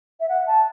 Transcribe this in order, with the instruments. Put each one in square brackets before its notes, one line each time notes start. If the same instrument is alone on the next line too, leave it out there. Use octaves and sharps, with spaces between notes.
[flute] E5
F#5
A5